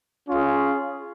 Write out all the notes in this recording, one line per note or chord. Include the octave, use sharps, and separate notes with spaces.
C#4 F4 G#4